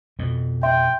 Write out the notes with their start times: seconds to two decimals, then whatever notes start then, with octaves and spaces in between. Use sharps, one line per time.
0.19 F2 B2
0.63 E5 G5 C6